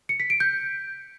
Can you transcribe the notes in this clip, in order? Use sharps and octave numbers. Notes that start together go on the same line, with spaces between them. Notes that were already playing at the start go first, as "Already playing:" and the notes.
C#7
B6
D7
G6